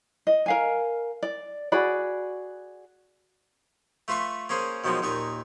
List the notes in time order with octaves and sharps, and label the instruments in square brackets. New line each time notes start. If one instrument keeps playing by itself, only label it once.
[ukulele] D#5
A#4 F5 G#5
D5
F#4 G#4 D5 B5
[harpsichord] A3 F4 B4 C6 C#6
A#3 C#4 G#4 C5
B2 D#3 F3 F#3 G#3
D#2 A#2 D#4 C#6